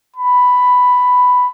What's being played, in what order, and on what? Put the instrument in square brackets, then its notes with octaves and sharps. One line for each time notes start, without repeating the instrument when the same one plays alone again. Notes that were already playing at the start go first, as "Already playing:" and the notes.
[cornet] B5